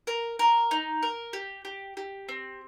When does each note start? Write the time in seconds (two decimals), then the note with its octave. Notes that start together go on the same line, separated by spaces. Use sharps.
0.07 A#4
0.39 A#4
0.71 D#4
1.02 A#4
1.33 G4
1.65 G4
1.97 G4
2.29 C4